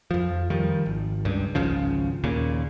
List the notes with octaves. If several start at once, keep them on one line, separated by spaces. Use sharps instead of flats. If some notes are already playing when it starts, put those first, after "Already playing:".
F2 F3
D#3 F3 G3
G#1
C#2 G2
G#1 C#2 C#3 F3
D#2 A#2 C#3